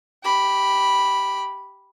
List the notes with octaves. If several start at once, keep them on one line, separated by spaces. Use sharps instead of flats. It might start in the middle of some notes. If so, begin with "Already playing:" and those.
G4 B5